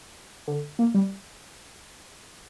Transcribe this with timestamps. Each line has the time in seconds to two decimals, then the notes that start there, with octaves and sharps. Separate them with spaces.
0.48 D3
0.79 A#3
0.94 G3